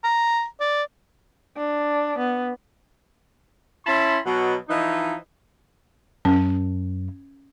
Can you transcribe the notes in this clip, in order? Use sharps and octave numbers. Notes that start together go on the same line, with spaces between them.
A#5
D5
D4
B3
C#4 E4 A5 B5 C6
B2 F#3
E3 F3 D#4
F#2 C#4